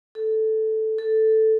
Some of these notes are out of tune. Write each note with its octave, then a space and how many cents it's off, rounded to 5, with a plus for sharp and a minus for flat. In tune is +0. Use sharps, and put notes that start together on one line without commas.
A4 -5
A4 +0